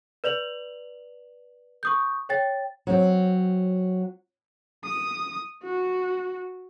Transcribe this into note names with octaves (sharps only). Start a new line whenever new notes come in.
B4 D5 F7 F#7
C#6 D#6 G6
C#5 G5 A6
F#3 C4
D#6
F#4